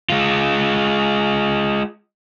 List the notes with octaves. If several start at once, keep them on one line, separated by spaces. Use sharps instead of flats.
G#3 F4